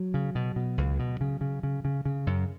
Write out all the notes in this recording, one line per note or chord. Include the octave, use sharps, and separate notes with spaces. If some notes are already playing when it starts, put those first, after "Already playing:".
Already playing: F#3
C#3
B2
B2
C#2
B2
C#3
C#3
C#3
C#3
C#3
F#2